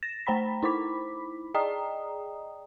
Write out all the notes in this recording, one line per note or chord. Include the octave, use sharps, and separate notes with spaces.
A6 A#6 E7
A3 C5 G5 A#5 B5 B6
D#4 E4 C5 B5 D6 B6
G#4 D5 D#5 G5 A#5 D#6